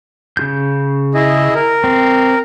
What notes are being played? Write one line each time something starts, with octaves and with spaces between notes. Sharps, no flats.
C#3 F4 G6
E4 G#4 D#5
A#4
C4